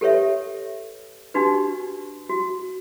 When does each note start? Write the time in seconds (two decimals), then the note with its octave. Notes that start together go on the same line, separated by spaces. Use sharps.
0.01 G4 A4 B4 C#5 E5
1.34 D4 D#4 F#4 G4 B4
2.29 F#4